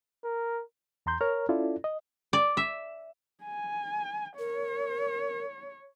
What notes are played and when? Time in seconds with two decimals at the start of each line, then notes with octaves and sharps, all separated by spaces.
0.24 A#4
1.06 E2 A#5 C6 G6
1.21 A#4 C#5 A#5 F6
1.49 C#4 E4 F4 A4 D5
1.84 D#5
2.33 D5
2.57 E5
3.44 G#5
4.39 A#4 C#5